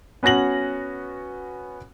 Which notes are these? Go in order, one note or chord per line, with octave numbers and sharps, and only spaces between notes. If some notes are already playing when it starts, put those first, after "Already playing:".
B3 C#4 F#4 A#6 F#7